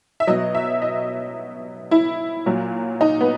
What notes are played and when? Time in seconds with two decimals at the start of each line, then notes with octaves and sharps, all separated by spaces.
0.20 E5
0.27 B2 F#3 D#5
0.55 E5
0.82 D#5
1.91 E4
2.46 A#2 F#3
3.01 D#4
3.21 B3